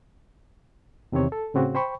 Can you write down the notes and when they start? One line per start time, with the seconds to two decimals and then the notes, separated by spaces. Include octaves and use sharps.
1.12 E2 C3 D#3 C4 C#5
1.32 A4
1.54 A2 C#3 C4 F#4
1.75 C5 G5 B5 C#6